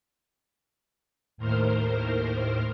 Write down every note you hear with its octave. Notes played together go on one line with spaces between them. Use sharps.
D#2 A2 A#4 C5 F6